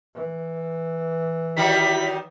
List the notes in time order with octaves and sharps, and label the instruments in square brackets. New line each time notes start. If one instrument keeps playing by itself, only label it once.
[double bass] E3
[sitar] D#3 F#3 G3 [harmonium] E4 [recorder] B6